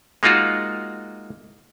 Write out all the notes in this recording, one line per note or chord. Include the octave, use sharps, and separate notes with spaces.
G#3 A#3 D#4 F4 F#4